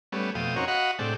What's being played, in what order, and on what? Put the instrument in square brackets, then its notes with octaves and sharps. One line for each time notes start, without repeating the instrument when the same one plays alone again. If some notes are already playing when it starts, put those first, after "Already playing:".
[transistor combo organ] G3 A3 B3 C#4
F2 B2 A3 F5 G5 D#6
C4 C#4 D#4 F#4 A#4 C#5
F#4 D#5 F5 F#5 B5 C#6
A2 C3 G#3 D4 A4 G5